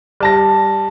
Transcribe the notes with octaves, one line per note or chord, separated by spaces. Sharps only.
G3 A5 A#6